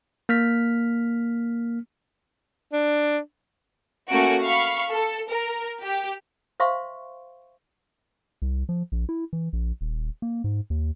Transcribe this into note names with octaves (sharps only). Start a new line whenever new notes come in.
A#3 F6 B6
D4
A3 A#3 C#4 F#4 D7
F5 B5 C#6 F6
A4
A#4
G4
C5 E5 F5 C6 C#6
C2
F3
A#1
E4
E3
A#1
D#1
A#3
G#2
D#2